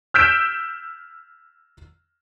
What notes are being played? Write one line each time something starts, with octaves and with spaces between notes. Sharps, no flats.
E6 F6 G6 B6 D7 E7